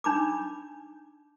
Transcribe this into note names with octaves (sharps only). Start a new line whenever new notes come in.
D4 D#4 B5 D6